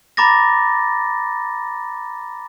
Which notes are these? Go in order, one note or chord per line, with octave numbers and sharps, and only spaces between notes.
A#5 B5 D6 A6 A#6